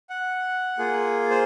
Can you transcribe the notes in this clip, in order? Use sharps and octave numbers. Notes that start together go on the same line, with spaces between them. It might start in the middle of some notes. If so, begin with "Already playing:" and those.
F#5
A#3 F4 G#4
C5